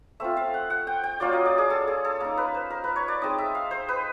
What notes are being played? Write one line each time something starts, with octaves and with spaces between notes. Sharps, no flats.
A3 C4 F4 E5
F5
F#5
F#5
G5
G5
F#3 A#3 C#4 F4 D5
D#5
D5
G#4
A4
G#4
A4
A#3 D#4 A#4
B4
C5
A#4
B4
C#5
D5
G#3 C4 D#4 D#5
E5
F5
C5
B4